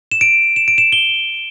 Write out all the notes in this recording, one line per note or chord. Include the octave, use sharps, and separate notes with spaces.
E7
D7
E7
D7
E7
G7